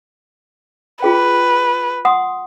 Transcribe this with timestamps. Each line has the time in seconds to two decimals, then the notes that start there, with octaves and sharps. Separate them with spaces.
1.03 F4 G#4 B4 G5
2.05 F#5 C6 D#6